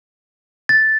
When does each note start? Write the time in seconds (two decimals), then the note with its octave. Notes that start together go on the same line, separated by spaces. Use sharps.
0.69 A6